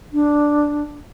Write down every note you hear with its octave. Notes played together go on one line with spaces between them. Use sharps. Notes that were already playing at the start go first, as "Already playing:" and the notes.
D4